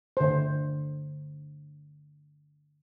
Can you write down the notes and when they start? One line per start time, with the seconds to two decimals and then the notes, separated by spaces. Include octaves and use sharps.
0.17 D3 C5